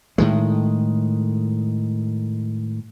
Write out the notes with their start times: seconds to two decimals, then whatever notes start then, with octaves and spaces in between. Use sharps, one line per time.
0.18 A2 D#3 G#3